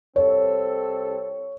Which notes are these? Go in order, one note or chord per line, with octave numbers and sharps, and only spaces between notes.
C2 C4 A4 C#5